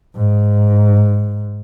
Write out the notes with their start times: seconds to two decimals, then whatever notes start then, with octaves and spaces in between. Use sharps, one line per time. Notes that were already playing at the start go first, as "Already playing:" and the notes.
0.16 G#2